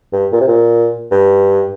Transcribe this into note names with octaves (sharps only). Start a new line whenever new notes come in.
G2
A#2
C3
A#2
G2